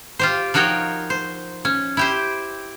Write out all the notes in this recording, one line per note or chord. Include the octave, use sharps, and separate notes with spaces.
F4 G4 C5
F3 D#4 F#4 A#4 C#5 G5
C5
C#4
E4 G4 C5